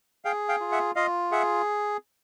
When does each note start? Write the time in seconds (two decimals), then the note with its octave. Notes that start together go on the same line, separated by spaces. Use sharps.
0.25 G#4 F5 G5
0.49 F5 G5
0.60 F4
0.72 E5 F#5
0.95 F4 D#5 F5
1.31 G#4 E5 F#5